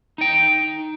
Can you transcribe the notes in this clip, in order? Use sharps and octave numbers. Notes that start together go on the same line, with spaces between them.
D#4 G5